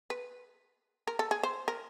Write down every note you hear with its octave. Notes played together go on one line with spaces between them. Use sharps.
B4
A#4
A4
G#4
C5
A#4